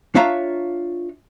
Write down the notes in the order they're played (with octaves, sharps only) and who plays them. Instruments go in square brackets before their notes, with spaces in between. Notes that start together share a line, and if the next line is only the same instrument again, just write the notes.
[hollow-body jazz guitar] D4 F4 C#5 E5 F5 A#5